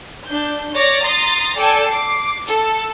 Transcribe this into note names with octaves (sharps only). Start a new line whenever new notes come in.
D4 G6
C#5 D5 A6 A#6
A#5 C6 D#6 A6
A4 D5 G5 G#5
D6 C7
A4